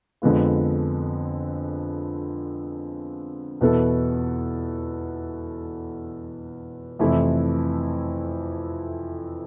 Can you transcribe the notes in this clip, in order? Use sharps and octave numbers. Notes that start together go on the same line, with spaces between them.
F2 D3 G#3 B3 F4
E2 B2 B3 E4 A4
F2 C3 E3 A3 E4